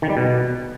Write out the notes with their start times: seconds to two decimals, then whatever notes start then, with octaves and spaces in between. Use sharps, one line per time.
0.02 D#3
0.09 G3
0.17 B2